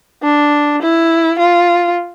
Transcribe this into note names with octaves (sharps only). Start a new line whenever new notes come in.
D4
E4
F4